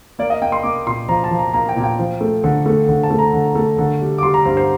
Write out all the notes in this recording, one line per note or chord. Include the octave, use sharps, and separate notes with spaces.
A#3 D5
D#5
A#3 G5
C6
A#3 D6
A#2 C6
F3 A#5
A5
F3
A#5
A#3 A#5
G5
A#2
G5
F3
A3
D3
A3
D3
A5
A3
A#5
D3
A3
D3
G3
D6
G3 C6
A#5
G2 C5
C5